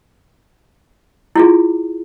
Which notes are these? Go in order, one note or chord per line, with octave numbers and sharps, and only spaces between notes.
E4 F4 G#4